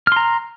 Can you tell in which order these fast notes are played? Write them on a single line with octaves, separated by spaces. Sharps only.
F6 C6 A#5